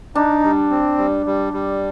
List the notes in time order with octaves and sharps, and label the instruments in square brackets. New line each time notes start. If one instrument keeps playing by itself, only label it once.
[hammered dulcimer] D4 [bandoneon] D#4
[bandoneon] G3
C4
G3
G3
G3